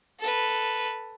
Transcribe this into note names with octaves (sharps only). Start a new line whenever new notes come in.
A4 B4